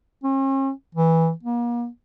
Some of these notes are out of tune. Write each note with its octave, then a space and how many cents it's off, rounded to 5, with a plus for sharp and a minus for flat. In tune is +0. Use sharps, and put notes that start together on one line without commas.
C#4 -45
E3 -10
A#3 +40